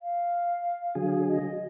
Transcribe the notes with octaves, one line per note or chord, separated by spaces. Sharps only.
F5
D3 F#3 G#4
D#5